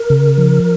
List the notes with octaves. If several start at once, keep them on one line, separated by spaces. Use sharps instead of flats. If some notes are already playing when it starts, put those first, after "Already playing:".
Already playing: A#4
C#3
F3